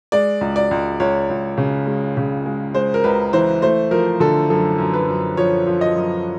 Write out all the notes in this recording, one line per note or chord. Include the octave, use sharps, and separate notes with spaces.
G#3 D5
C#2
D5
C#2
C#2 C#5
C#2
C#3
G#3
C#3
G#3
G#3 C5
A#4
C#2 B4
E3 C5
A3 C5
F3 A#4
D3 A4
F#2 A4
F#2
B4
F#2
F3 C#5
F3
D#5
F#2